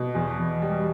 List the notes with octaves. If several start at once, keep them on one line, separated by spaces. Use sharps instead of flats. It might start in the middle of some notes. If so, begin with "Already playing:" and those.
Already playing: B2
E2
E2
G3